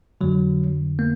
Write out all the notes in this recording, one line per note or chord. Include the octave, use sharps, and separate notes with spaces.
F2 D3 F#3
A#3